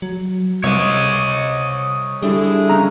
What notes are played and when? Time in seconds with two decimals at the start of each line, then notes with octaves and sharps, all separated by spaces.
0.02 F#3
0.64 C2 C3 C#5 D#5
2.23 D3 G3 E4 G#4
2.69 C#3 A#5